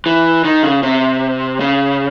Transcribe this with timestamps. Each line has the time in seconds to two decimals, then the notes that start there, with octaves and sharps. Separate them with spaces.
0.06 E3
0.44 D#3
0.63 C#3
0.83 C3
1.60 C#3